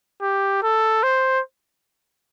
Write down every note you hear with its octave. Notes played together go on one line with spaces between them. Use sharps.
G4
A4
C5